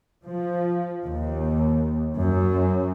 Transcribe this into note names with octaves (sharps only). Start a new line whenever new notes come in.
F3
D#2
F#2